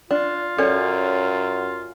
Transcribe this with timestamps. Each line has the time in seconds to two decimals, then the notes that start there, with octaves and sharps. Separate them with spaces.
0.11 D4 F4
0.58 F#2 C#4 A4 C#5 D5 G#5